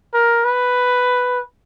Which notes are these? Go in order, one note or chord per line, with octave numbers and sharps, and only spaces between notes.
A#4
B4